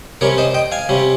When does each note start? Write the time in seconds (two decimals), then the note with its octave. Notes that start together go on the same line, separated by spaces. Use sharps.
0.21 C3 G3 C#4 A#4 C#5
0.38 C5 D#5
0.54 D#5 G5
0.72 F5 G#5
0.89 C3 G3 C#4